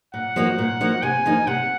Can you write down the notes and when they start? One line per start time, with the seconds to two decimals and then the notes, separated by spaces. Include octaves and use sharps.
0.14 A#2 F#5
0.36 F3 A#3 D#4 F#4
0.58 A#2
0.81 F3 A#3 D#4 F#4
1.03 C3 G#5
1.26 F3 A#3 D#4
1.47 C3 F#5